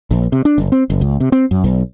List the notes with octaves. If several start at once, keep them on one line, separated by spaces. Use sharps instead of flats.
A#1
C3
D4
F#1
C4
F#1
C#2
C3
C4
F#2
B1